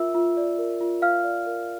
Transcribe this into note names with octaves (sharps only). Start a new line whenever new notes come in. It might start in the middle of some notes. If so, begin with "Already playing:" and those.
Already playing: F4 A#4 E5 E6
F4
D5
A#4
F4
F4 F5 F6
D5
A#4